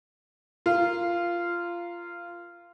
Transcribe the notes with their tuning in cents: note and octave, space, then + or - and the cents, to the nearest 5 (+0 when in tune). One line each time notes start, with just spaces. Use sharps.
F4 -15 A#4 +5